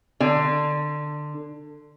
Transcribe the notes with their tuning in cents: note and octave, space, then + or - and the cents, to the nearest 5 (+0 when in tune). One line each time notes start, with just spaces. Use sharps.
D3 +20